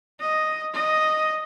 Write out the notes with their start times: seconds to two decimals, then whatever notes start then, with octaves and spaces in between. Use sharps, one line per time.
0.20 D#5
0.74 D#5